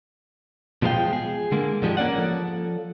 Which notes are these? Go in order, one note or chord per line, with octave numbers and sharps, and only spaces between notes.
B2 F3 G#3 A#4 F5 G5
G#4
D3 G#3 A#3
G#2 D3 F3 G3 G#3
A#3 C#4 D5 F#5
F3 A4